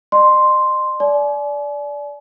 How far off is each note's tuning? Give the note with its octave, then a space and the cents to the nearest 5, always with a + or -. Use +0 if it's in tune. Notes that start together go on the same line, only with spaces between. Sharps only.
D#5 -45 C6 +0
D5 -15 G#5 +40